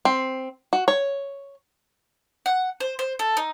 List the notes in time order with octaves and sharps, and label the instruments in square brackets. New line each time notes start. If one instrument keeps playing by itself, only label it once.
[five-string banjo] C4
F#4
C#5
[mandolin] F#5
C5
C5
A4
D#4